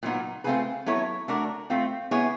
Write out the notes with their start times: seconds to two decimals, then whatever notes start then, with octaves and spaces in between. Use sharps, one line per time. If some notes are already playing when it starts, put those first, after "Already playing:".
0.03 A#2 F#3 B3 D#4
0.44 A3 C4 F4 G#4 B4
0.86 F#3 B3 E4 A4 C#5
1.28 A3 D4 F#4 A#4
1.70 A3 C4 F4
2.11 B3 E4 G#4 C#5